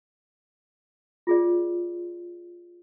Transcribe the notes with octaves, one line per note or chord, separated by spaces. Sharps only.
F4 G#4 D5